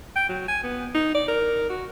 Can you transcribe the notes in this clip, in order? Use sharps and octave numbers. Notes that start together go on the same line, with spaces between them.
G5
F#3
G#5
B3
D#4
D5
A#4
F#4